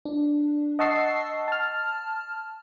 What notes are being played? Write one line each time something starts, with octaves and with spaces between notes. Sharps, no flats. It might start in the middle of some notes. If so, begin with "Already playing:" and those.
D4
D#5 F#5 A5 C#6 E6 C7
A5 F6